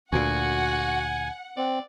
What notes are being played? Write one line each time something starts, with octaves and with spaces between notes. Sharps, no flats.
D2 A#2 F#4 F#5 G#5
C4 D5